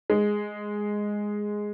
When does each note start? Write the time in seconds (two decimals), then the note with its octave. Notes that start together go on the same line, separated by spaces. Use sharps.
0.10 G#3